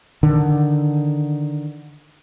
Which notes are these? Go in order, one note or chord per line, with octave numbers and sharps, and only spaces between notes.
D3 D#3